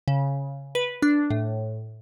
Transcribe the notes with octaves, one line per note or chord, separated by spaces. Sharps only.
C#3
B4
D4
A2